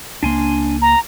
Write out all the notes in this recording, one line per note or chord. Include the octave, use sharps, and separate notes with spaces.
C#2 A#3 D4 G#5 C6
A#5